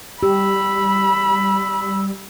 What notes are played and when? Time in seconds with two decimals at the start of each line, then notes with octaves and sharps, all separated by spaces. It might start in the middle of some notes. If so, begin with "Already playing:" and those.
0.23 G3 G4 B5 E6